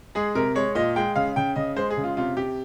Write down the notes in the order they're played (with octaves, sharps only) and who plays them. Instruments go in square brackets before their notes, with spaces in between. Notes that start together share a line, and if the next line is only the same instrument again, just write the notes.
[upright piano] G#3 G#4
C3 A#4
G#3 C#5
A#2 D#5
G#3 G5
C#3 F5
C#3 G5
C#3 D#5
G#3 C5
G#4
C#3
F4
C3 F4
C3 G4